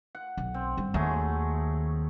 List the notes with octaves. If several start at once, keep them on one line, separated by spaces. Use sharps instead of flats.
F#5
B1
C4
G2
D#2 F#3 A3 G#4